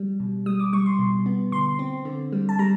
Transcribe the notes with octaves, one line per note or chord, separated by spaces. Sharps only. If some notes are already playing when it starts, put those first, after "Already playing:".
Already playing: G3
B2
G3 D#6
D6
G3 C#6
C6
B2
B3
D3 C6
C4
D3
G3
A5
G3 A#5